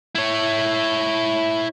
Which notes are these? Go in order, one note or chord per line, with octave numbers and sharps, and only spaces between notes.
E4 C#5